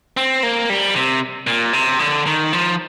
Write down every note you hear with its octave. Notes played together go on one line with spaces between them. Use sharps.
C4
A#3
G3
C3
A#2
C3
D3
D#3
F3